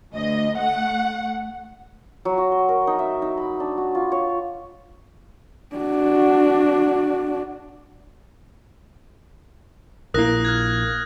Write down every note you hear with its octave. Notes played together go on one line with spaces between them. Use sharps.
D2 D#5
A3 F#5
F#3
F#4
C6
A#4
D#4
E5
D#4
B5
D4
F#4
F4
C#5
D4 F#4
A#1 A#3 E4 A#4 D#6 F#6 A#6
F6 F#6 G#6